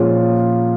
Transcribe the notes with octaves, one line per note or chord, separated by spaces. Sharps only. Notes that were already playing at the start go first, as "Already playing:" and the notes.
Already playing: A#2 F3 G#3 C#4 F4